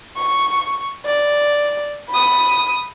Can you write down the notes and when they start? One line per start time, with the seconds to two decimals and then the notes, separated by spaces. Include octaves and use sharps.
0.17 C#6
1.05 D5
2.10 B5 D#6